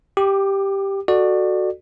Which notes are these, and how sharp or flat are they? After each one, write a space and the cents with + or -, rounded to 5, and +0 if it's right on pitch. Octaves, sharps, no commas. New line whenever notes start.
G4 +0 D6 +25
F#4 +0 A4 +0 D5 +25